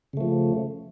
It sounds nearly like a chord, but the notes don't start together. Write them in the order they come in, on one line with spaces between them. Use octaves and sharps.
C#3 A3 F3